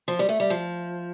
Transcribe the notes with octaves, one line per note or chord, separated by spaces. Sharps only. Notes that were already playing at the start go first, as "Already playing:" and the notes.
F3
G3
A3
G3
F3